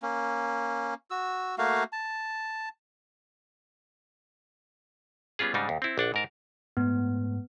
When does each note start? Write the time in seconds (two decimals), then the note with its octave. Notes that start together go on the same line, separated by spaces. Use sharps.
0.02 A#3 C#4
1.11 F#4 E6
1.58 A3 A#3 F#4 F5
1.92 A5
5.39 G3 B3 C#4 F4 G#4
5.54 G#2 C#3 G3 D4 D#4
5.69 D#2
5.82 C4 E4
5.98 A#1 D4 F#5
6.14 G#2 A#4 A5
6.77 G#2 A3 B3